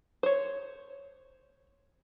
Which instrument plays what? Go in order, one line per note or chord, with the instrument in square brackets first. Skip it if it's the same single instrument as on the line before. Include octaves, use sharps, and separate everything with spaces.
[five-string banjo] C5 C#5